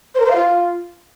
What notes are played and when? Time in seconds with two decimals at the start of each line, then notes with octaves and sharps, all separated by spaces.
0.15 C5
0.20 A#4
0.25 C5
0.30 F5
0.36 F4